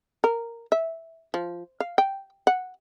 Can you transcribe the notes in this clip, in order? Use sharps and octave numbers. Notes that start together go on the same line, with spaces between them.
A#4
E5
F3
F5
G5
F#5